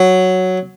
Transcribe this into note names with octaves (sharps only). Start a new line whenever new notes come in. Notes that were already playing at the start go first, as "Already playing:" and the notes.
Already playing: F#3